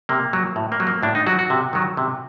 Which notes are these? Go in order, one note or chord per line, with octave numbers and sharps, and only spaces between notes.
C3 A#3
F#3
A2
A#3
F#3
A#3
A2 D4
D#4
F#3 F#4
F#4
C3
D#3 F#3
C3